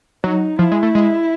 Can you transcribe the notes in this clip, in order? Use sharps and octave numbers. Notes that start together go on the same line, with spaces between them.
F#3 D#4
F3 E4
G#3
A3
G#3